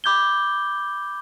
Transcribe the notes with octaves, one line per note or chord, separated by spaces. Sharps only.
B5 D6 G6 G#6 G7